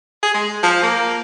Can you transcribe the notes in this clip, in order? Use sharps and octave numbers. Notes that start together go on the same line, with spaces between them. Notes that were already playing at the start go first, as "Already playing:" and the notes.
G#4
G#3
F3
A#3